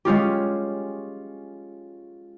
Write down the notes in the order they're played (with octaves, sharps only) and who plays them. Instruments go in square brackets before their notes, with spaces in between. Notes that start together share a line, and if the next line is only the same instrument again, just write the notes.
[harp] G#3 C#4 F4 G4